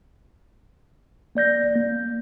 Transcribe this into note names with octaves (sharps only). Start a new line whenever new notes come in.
A#3 D5 G6 A#6
A#3